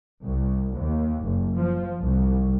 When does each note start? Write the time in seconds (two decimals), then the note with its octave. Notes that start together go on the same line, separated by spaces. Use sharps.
0.24 C2
0.76 D#2
1.24 F#1
1.56 F3
2.00 C2